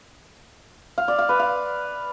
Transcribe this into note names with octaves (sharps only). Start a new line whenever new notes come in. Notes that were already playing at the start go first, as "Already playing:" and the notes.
F5
D5
F5
B4
F5